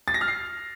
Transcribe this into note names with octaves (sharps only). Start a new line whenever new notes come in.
A6
A#6
F6
C7